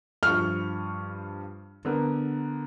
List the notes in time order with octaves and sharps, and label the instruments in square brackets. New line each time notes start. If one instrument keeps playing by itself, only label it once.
[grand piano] G2 F3 C#6 [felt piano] F6
[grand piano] D3 B3 A#4